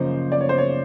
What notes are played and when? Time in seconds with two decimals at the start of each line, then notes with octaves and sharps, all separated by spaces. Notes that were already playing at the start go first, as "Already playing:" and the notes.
Already playing: F#2 C#3 F3 A#3 D#4 C5
0.32 D5
0.41 C#5
0.49 C5
0.58 C#5